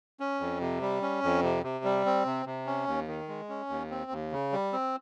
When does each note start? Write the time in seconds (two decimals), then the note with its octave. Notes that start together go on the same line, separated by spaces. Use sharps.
0.20 C#4
0.40 F2
0.61 C3
0.81 G3
1.02 C#4
1.23 F2
1.43 C3
1.64 C3
1.84 G3
2.06 C4
2.25 C3
2.46 C3
2.66 C#4
2.87 D#2
3.07 D#3
3.28 G#3
3.49 C#4
3.69 D#2
3.90 C4
4.11 D#2
4.32 C#3
4.52 G3
4.73 C4